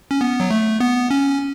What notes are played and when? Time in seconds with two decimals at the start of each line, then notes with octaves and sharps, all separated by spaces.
0.11 C#4
0.21 B3
0.40 F#3
0.51 A3
0.80 B3
1.10 C#4